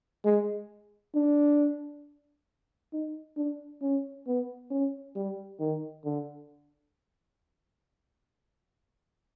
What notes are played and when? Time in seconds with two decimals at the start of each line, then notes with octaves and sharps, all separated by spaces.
0.25 G#3
1.15 D4
2.93 D#4
3.37 D4
3.82 C#4
4.27 B3
4.71 C#4
5.15 G3
5.60 D#3
6.05 D3